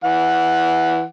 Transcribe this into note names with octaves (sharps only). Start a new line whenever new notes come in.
E3 F#5